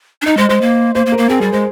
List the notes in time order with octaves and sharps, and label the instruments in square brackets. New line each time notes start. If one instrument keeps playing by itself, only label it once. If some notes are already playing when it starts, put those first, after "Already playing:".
[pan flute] D4
[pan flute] D#4 [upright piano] D#5
[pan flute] G#3 [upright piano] C5
[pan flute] G#3 [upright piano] C5
[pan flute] A#3
[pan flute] A#3 [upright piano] C5
[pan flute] A#3
[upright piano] A#4
[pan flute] A#3
[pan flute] C4 [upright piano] G#4
[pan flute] G3 [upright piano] G#4
[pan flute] G#3 [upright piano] C5